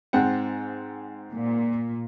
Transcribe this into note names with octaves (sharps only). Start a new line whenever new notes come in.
G#2 C4 F#5
A#2